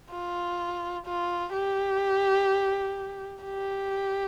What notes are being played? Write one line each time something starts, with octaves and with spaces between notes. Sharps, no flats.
F4
F4
G4
G4